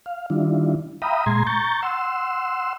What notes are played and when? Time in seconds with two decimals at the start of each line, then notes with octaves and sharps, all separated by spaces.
0.06 F5
0.30 D#3 G3 D4 E4 F4
1.02 E5 F5 G5 A#5 B5 D#6
1.26 A#2 G#3 A#5 C6 G#6
1.47 A#5 C#6 G6 A6
1.82 F#5 C6 E6